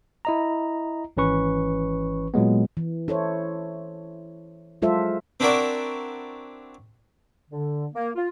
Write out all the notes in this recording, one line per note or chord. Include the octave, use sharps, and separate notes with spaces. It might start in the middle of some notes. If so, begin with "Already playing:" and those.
E4 D#5 A#5
G#1 E3 C#4 B4 C#6
A#2 F#3 G#3 B3
E3
E4 A4 C5 C#5
F#3 G#3 F4 A4 C5 E5
C4 D4 E4 F#4 A#4 D5
D3
A#3
F4